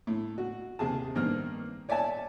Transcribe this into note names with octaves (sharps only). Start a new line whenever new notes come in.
A2
F#4
D#2 C3 G#4 A5
G2 D#3 A#3 C4 F6
C#5 D5 E5 G#5 A5